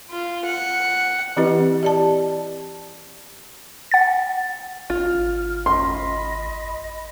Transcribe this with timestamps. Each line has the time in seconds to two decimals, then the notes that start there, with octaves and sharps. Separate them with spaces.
0.11 F4
0.45 F#5
1.37 E3 C4 E4 G4 B4 D#5
1.83 G4 D5 A5
3.91 F#5 A6
4.90 G#1 F4 F6
5.66 D#5 B5 C6